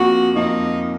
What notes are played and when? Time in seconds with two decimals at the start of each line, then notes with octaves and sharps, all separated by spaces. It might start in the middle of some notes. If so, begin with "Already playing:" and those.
Already playing: F2 F3 A#3 F#4
0.36 F2 F3 A#3 D#4